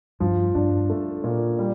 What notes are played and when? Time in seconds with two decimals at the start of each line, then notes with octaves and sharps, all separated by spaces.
0.20 G2 F3
0.55 G2 D4
0.90 A3
1.24 A#2
1.59 G3